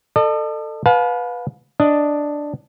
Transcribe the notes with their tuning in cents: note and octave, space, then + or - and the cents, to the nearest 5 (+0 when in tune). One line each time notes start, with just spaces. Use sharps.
A4 +15 D#5 -45
B4 -5 F5 +35 A5 -40
D4 +0 D#5 +0